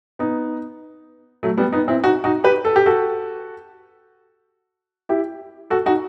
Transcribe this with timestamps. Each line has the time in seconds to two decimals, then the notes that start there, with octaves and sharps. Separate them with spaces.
0.19 B3 D#4
1.43 F#3 A3
1.58 G3 B3
1.72 B3 D#4
1.88 C4 E4
2.04 D#4 F#4
2.24 D#4 F#4
2.44 G4 B4
2.65 A4
2.76 G4
2.86 F#4 A4
5.09 E4 G4
5.70 F#4 A4
5.86 D#4 F#4